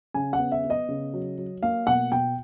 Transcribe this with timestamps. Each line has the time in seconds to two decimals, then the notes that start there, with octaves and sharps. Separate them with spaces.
0.14 C#3 G#5
0.33 F#5
0.39 B3
0.52 E5
0.64 B3
0.70 D#5
0.89 C#3
1.13 F#3
1.38 F#3
1.63 A#3 F5
1.87 B2 F#5
2.12 B2 G5